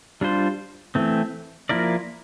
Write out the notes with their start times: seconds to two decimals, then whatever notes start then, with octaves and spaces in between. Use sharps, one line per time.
0.21 G3 D4 F4 C5
0.95 E3 A3 C4
1.69 F3 A#3 E4 A#4 D5